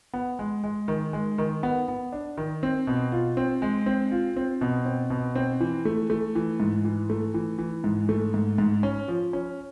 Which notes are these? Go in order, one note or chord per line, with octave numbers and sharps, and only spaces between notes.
B3
G#3
G#3
D#3
G#3
D#3
B3
B3
D4
D#3
C4
B2
F4
C4
G#3
C4
F4
C4
B2
C4
B2
C4
E3
A3
A3
E3
G#2
E3
A3
E3
E3
G#2
A3
G#2
G#2
C#4
F3
C#4